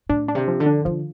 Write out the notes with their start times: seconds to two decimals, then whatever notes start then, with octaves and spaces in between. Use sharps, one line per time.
0.09 A2 D4
0.28 D4
0.35 C3
0.48 F3
0.60 D3
0.66 D4
0.85 D3 F3